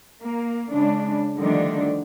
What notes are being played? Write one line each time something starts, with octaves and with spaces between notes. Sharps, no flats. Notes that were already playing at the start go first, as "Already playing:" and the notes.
A#3
C#3 G#3 D4
D3 D#3 F3 G3 A3 D4